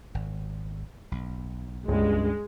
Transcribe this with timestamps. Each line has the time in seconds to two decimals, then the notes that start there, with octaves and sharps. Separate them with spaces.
0.14 G#1
1.12 B1
1.88 C#2 G2 G#3